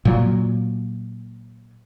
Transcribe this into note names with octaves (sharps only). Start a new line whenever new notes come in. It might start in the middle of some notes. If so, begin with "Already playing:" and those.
A#2 F#3